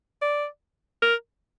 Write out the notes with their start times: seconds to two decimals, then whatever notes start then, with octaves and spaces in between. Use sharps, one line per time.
0.22 D5
1.02 A#4